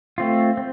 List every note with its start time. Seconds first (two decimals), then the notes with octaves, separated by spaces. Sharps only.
0.18 A3 C4 F4
0.57 C4